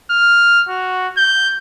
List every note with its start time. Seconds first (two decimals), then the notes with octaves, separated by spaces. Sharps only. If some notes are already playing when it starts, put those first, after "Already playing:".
0.11 F6
0.69 F#4
1.18 G6